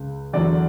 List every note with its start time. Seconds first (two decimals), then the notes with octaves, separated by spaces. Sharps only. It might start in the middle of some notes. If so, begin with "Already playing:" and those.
Already playing: C#2
0.33 E2 D3 F#3 D5